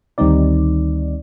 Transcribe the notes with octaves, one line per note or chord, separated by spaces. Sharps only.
D2 D#3 G3 C4 D#4 D5